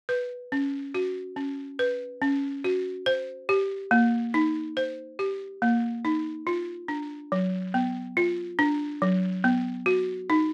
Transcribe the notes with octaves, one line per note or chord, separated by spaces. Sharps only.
B4
C#4
F#4
C#4
B4
C#4
F#4
C5
G4
A#3
D#4
C5
G4
A#3
D#4
F4
D4
F#3
B3
F4
D4
F#3
B3
F#4
D#4